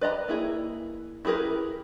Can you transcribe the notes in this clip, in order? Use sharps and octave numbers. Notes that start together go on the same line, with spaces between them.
B4 D5 D#5 A#5 B5
A#3 E4 G#4
E4 G4 G#4 A#4 B4